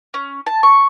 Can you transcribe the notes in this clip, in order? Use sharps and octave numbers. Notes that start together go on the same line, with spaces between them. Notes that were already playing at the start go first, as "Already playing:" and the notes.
C#4
A5
C#6